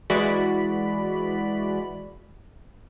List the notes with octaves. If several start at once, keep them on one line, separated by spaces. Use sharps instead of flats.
E3 G#3 F#4 D5 B5